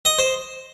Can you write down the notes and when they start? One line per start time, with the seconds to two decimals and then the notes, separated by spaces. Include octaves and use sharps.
0.05 D#5
0.18 C5